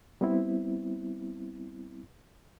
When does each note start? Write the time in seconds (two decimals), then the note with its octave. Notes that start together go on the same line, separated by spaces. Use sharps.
0.21 G3 B3 C4 E4